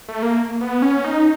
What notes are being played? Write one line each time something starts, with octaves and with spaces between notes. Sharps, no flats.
A3
A#3
B3
C#4
D#4